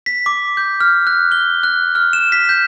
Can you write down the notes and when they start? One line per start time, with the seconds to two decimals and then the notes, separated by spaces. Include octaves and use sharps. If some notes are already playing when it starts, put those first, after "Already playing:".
0.06 B6
0.26 D6
0.57 G6
0.80 F6
1.07 F#6
1.32 G7
1.63 F#6
1.95 F6
2.13 E7
2.32 B6
2.49 G6